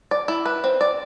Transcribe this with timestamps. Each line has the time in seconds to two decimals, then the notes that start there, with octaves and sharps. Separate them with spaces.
0.11 D5
0.28 E4
0.46 B4
0.64 C4
0.81 D5